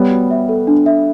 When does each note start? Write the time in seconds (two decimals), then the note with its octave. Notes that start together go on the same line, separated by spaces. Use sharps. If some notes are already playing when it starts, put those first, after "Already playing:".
Already playing: G3 B3 C#5
0.11 F#4
0.31 E5
0.49 A4
0.67 D4
0.86 E5